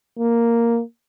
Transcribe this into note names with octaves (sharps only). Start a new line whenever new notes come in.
A#3